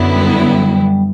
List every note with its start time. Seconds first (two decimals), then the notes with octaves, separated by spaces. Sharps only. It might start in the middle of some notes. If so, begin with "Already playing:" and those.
Already playing: F#2 D3 F#3 B3 E4
0.13 G3
0.50 G3
0.75 G3